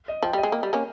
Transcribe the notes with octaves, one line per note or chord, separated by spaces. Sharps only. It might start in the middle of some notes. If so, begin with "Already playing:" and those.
D#5
F3 G5
G3
D#5
G#3
A#3
G3
A#3 C#4